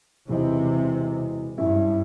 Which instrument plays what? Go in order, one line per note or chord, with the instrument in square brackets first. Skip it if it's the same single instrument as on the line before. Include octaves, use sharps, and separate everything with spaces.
[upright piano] E1 E3 D#5 [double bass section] C3
[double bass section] G2 [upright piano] C#4 E4